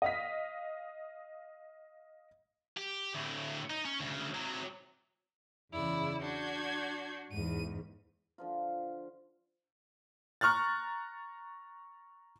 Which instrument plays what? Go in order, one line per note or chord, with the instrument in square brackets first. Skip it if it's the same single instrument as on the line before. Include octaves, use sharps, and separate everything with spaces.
[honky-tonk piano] D#5 F5 B6
[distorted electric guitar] G4
D2 A2
D#4
C#4
D2 C#3
C3 F#3
[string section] E2 C#3 [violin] E4 D5
[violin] D4 F#4 [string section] G6 G#6
[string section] E2 G#2 [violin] D#7
[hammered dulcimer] D3 F3 F4
[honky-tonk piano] A#5 C#6 F6 F#6 A6